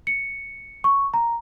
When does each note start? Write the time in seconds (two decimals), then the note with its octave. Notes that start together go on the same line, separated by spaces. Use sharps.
0.07 C#7
0.84 C#6
1.14 A#5